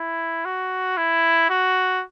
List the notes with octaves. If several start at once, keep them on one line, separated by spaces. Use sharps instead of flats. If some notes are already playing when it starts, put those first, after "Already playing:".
Already playing: E4
F#4
E4
F#4